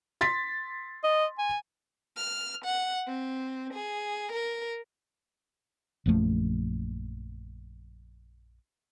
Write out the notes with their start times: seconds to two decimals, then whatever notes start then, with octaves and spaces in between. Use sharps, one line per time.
0.21 C6 A6 B6
1.04 D#5
1.38 G#5
2.17 F6
2.65 F#5
3.07 C4
3.73 G#4
4.32 A#4
6.06 A#1 F#2 F3 A3